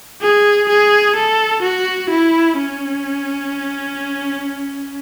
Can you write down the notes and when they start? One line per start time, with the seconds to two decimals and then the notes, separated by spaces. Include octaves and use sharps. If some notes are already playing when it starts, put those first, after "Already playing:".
0.22 G#4
0.69 G#4
1.16 A4
1.62 F#4
2.10 E4
2.57 C#4